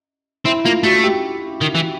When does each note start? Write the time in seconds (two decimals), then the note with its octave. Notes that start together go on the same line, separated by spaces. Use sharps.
0.45 C4 E4
0.65 A#3 F4
0.83 A3 F#4
1.04 G4
1.61 D#3
1.75 E3